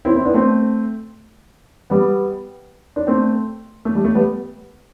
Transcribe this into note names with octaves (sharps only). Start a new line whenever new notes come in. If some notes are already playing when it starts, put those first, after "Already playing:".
C4 E4
C4 E4
B3 D4
A3 C4
G3 B3
D4
A3 C4
A3
G3
A3
G3 B3